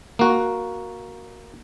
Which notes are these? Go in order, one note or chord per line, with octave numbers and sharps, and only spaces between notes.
A#3 F#4